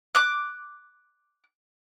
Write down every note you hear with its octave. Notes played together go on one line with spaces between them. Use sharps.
D6 F#6